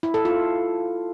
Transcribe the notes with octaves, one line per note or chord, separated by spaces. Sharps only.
E4
A4
F4